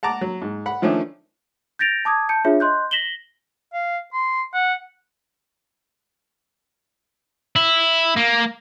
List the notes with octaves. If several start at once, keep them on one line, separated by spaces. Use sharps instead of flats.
F#5 A5 A#5 D6
F#3
G#2
F#5 B5
D#3 F3 A3 C#4 D4
G6 A6 A#6 D7 F7
A5 D6 D#6 G#6
A5 G6 C#7
D4 F4 G#4 C#5 E5
D#5 C6 F#6 G6
A#6 B6 E7 F#7 G7
F5
C6
F#5
E4
A#3